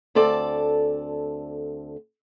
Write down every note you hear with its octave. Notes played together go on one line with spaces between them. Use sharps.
D2 C4 A4 D5 A5